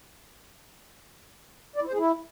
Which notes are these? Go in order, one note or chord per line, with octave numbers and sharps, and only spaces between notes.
D5
E4
C5
G#4
E4